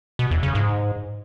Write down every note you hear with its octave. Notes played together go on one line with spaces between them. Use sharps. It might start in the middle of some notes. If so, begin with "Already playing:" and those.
B2
E2
C#3
G#2